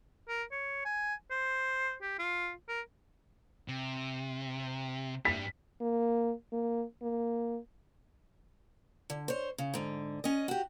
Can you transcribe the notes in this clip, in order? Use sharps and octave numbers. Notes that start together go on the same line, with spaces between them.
A#4
C#5
G#5
C5
G4
F4
A#4
C3
G2 G3 B6
A#3
A#3
A#3
D3
C5 C#5
C#3
G#2 D3
C#4 D#5
F#4 G4